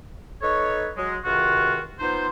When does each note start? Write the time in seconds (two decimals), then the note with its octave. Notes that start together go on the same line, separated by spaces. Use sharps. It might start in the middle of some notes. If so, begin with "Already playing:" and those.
0.42 D#4 A4 B4 C#5
0.97 F#3 G#3
1.25 C#2 C3 D#3 F4 F#4
2.00 B3 D#4 F4 C5